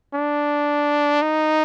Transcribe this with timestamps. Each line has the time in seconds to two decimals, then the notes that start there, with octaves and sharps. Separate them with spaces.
0.14 D4
1.22 D#4